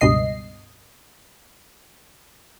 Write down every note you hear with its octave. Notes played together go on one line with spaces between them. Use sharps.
C#2 G2 B2 D#5 C7